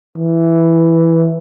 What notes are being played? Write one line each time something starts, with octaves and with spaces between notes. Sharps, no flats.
E3